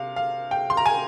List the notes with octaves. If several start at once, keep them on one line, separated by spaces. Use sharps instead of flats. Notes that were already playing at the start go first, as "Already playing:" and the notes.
Already playing: C3 F5
F5
G5
C6
A#5
G#5